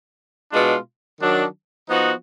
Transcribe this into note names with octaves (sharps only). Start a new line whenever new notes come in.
B2 G#3 D4 F4
D#3 F#3 D4
F3 B3 D#4 F#4